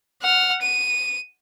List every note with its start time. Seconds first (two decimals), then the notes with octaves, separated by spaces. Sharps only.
0.22 F#5 F6
0.61 D#7